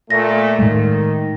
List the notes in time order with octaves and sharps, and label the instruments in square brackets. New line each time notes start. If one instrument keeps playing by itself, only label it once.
[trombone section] A#2 A3 [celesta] A#6
[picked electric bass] A2 G#3 A3 [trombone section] D#3